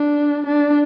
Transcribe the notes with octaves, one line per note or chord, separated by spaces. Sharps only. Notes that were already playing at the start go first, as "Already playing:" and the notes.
Already playing: D4
D4